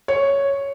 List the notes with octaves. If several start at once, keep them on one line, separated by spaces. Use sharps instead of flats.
C#5